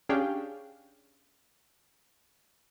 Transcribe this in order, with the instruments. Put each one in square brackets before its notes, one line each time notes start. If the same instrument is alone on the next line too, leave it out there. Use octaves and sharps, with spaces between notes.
[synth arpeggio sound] C#4 D4 G4 G#4 F5 G5